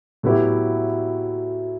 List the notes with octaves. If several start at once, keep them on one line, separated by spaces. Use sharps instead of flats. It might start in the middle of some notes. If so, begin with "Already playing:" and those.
A2 F#3 B3 E4 G4